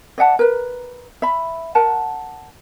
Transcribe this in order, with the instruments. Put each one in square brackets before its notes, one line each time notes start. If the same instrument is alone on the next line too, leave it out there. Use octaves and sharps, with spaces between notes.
[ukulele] D5 E5 F#5 A5
A#4 B4
E5 B5
A#4 F#5 A5